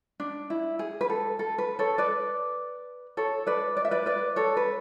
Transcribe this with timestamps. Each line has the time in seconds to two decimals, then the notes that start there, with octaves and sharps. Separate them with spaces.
0.20 D4
0.50 E4
0.79 G#4
1.01 B4
1.10 A4
1.39 A4
1.58 B4
1.79 A4 C#5
1.98 B4 D5
3.17 A4 C#5
3.47 B4 D5
3.77 D5
3.85 E5
3.91 B4 D5
4.06 B4 D5
4.36 A4 C#5
4.57 B4